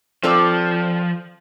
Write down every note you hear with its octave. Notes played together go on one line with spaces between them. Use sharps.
F3 C4 A4 D5